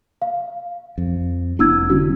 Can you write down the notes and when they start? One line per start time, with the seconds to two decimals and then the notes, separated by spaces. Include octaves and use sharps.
0.22 F5
0.98 F2
1.59 F1 B3 D4 E4 E6 G#6
1.90 D3 G3 C#4 F#4